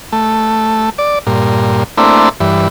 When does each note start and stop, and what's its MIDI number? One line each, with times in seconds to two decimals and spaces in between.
0.13 0.90 57
0.98 1.19 74
1.27 1.84 43
1.27 1.84 46
1.98 2.29 57
1.98 2.29 58
1.98 2.29 60
1.98 2.29 62
1.98 2.29 64
2.40 2.68 43
2.40 2.68 52